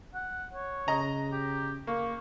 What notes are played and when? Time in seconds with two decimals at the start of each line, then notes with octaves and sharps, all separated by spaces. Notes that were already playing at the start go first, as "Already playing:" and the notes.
0.14 F#5
0.53 C#5
0.88 C#3 D#5 A#5
1.31 G4
1.87 A#3 C#6